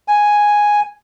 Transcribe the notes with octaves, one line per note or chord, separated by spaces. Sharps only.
G#5